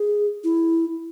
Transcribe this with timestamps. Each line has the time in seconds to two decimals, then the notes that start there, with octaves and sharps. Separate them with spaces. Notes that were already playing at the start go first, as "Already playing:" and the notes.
Already playing: G#4
0.44 E4